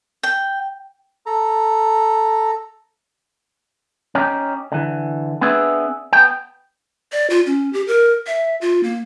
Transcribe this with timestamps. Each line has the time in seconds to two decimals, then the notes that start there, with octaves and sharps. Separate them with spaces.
0.23 G5
1.26 A4 A#5
4.15 C#4 D#4 G4
4.72 D3 E3
5.41 B3 C4 D4 G#4 B4 E5
6.13 B3 G5
7.12 D5
7.30 F4
7.46 C#4
7.73 G4
7.88 A#4
8.27 E5
8.61 F4
8.83 A#3